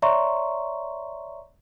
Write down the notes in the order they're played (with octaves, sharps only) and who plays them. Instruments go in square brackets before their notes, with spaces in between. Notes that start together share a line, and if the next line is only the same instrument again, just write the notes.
[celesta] C#5 D5 E5 A#5 C6 C#6